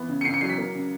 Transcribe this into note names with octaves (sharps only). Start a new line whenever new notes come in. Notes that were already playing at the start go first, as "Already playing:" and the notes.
Already playing: E3 B3
C#3
C#7
C#3 C7
C#7
F#3 C7
B6
A#3
C#3